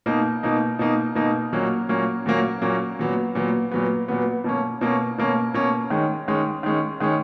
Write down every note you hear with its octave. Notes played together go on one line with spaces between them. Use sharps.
B2 A#3 D#4
B2 A#3 D#4
B2 A#3 D#4
B2 A#3 D#4
A#2 F#3 A#3 C#4
A#2 F#3 A#3 C#4
A#2 F#3 A#3 C#4
A#2 F#3 A#3 C#4
A#2 F#3 B3
A#2 F#3 B3
A#2 F#3 B3
A#2 F#3 B3
B2 A#3 C#4
B2 A#3 C#4
B2 A#3 C#4
B2 A#3 C#4
D#3 G#3 C#4
D#3 G#3 C#4
D#3 G#3 C#4
D#3 G#3 C#4